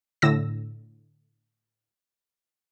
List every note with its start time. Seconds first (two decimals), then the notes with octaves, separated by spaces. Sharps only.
0.22 A2 D3 E6 A#6